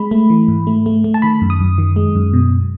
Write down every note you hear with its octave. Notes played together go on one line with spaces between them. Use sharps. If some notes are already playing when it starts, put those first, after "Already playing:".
Already playing: G#3 B5
A3
E3
G#2
A3
A3
A3
A5
D#3 B5
F#2
D#6
F#2
D#3
G#3
F#2
B2